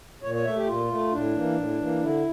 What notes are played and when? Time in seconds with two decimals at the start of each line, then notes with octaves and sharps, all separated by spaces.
0.23 A#2 C#5
0.34 C#5
0.45 A3 E5
0.56 G4
0.67 A#2 F4
0.89 A3
1.12 A2 D4
1.34 E3 A#3
1.56 A2
1.78 E3 A#3
2.01 D3 E4